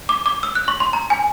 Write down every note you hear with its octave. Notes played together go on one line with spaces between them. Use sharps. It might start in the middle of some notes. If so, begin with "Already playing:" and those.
D6
D6
E6
F#6
C#6
C6
A#5
G#5